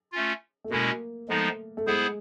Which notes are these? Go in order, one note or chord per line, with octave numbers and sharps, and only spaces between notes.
A3 C#4 F4
A3
B2 G#3 A#3 C#4 E4
F3 G#3 A3 B3 D#4
A3
G#3 B3 E4 G#4 C5